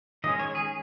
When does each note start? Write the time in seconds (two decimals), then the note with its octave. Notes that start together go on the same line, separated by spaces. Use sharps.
0.24 D#3 G#3 C#4 D#5
0.40 C#5
0.55 G#4